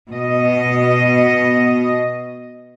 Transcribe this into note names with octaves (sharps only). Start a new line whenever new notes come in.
B2 D#5